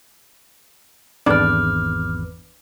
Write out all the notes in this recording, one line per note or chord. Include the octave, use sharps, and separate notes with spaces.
G#1 E2 D4 B4 D5 D6 F6